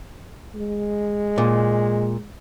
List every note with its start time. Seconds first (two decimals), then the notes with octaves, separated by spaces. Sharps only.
0.55 G#3
1.38 A#2